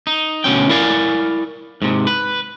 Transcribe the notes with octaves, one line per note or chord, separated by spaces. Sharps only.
D#4
D2 B2 C#4 G5
E4 A#4 D5 F5 G#5
G#2 C3
B4